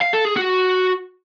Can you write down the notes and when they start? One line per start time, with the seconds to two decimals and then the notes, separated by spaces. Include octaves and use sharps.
0.02 F5
0.14 A4
0.25 G#4
0.37 F#4